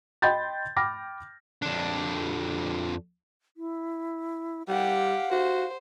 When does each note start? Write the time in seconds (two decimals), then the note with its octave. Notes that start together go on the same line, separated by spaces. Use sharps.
0.22 D#5 G5 B5 C6 G6 A6
0.77 G5 B5 D6 F6 A#6
1.62 F2 D4
3.57 E4
4.68 G3 G4 F5 F#5
5.31 F#4 C5